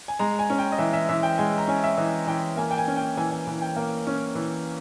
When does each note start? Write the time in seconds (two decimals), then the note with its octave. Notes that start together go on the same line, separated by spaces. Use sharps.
0.08 G#5
0.19 G#3 A#5
0.39 G#5
0.50 C#4
0.58 G5
0.72 D#5
0.78 E3 E5
0.93 E5
1.09 E3 E5
1.23 G5
1.38 G#3 G#5
1.58 A#5
1.68 C#4 G#5
1.84 E5
1.97 E3 D#5
2.27 E3 G5
2.57 A#3 G#5
2.71 G5
2.78 G#5
2.87 C#4
2.97 G5
3.17 E3 G#5
3.31 G#5
3.47 E3
3.61 G5
3.76 A#3
4.07 C#4
4.35 E3